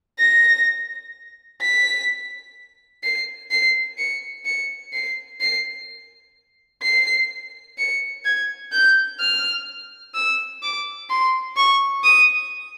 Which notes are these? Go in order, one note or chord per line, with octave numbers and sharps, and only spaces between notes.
A#6
B6
C7
C7
C#7
C#7
C7
C7
C7
C#7
G#6
G6
F6
E6
D6
C6
C#6
D#6